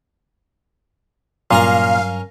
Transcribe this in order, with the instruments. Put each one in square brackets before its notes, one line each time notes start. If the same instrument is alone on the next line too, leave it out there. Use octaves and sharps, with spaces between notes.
[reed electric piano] G2 F#3 [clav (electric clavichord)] A#2 [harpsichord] C#4 A#4 A#5 [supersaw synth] F5